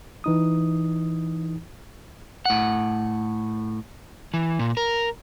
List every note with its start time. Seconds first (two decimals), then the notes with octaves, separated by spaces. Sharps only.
0.24 E3 D#4 D#6
2.46 A2 F#5
4.34 E3
4.59 A#2
4.77 A#4